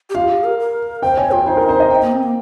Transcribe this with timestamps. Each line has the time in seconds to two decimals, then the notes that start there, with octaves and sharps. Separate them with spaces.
0.10 G4
0.15 F4 F5
0.30 G4
0.44 A#4
0.59 A#4
1.02 C5 G5
1.17 C#5 G#5
1.32 F4 G5
1.46 D#4 C5
1.57 A#4
1.69 C5
1.80 D#5
1.90 G5
2.02 A#3
2.12 C4
2.23 A#3